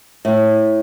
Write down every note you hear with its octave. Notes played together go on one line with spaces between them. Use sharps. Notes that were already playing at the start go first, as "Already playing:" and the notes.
A2